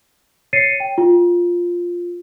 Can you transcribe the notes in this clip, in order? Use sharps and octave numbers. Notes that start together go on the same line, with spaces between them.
C#5 A6 C7 C#7 D#7
G5
F4